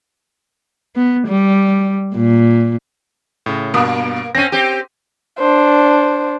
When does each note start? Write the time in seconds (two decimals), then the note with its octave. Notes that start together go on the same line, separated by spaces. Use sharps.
0.96 B3
1.28 G3
2.15 A#2
3.46 A2 C#3
3.74 G2 B2 A#3 D#6
4.35 C4 C#4 A#6 D#7
4.52 C4 G4
5.39 D4 C5